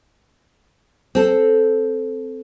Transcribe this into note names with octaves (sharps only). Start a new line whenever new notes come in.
C4 A4